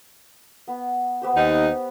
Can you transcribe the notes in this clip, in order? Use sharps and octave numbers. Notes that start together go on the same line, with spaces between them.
B3
B3 G4 C5
D#2 D#4